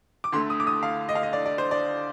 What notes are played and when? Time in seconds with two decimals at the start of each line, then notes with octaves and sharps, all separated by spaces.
0.24 D6
0.32 D2 D3 A3 C6
0.50 D#6
0.60 D6
0.67 D#6
0.83 F5
1.09 D#5
1.15 F5
1.23 D#5
1.33 D5
1.46 D5
1.58 C5
1.71 D5